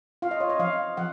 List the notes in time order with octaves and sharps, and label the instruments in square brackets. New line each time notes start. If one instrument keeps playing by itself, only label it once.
[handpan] F4 F5
D#5
C#5
D#5
F3 F5
F3 F#5